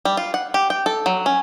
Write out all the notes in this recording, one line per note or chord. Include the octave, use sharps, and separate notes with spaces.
G3
F4
F#5
G4
G5
A4
F#3
C#4